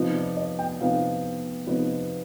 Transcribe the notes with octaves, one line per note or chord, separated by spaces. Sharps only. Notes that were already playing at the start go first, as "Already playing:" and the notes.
Already playing: C3 F3 B3 D#4
D5
D#5
G5
C3 F3 B3 D#4 F5
C3 F3 B3 D#4